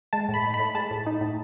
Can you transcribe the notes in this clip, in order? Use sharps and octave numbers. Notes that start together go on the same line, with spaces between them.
G#3 A5
A2
B5
D#4
B5
A2
G#3 A5
A2
D#4
A2